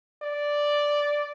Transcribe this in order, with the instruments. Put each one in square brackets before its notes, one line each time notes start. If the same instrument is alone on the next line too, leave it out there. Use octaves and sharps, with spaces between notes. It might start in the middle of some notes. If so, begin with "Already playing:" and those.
[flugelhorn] D5